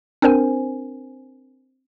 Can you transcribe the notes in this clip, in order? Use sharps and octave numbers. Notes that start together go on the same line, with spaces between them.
C4 D4 A#4 C5 G#5